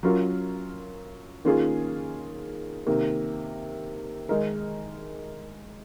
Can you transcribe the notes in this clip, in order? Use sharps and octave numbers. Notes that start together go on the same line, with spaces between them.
F#3 C#4 F4 A#4
D#3 A#3 C#4 F4 G#4
C3 D#3 A#3
D#3 G#3 D#4 A#4